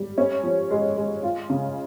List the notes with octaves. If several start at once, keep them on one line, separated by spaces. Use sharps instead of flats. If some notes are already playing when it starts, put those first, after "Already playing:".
Already playing: G3
C#4
F3
G#3
G#3
F4
C#3